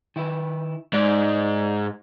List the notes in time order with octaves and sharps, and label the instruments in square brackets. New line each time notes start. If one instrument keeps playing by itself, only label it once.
[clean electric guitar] D#3 E4 B4
[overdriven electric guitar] G#2 [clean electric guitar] D5